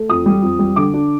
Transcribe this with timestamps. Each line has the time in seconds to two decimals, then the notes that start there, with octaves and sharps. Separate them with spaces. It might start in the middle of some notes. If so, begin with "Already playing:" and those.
Already playing: A3
0.10 F2 D#6
0.26 G3
0.42 F2
0.59 G3
0.76 D3 D6
0.94 D4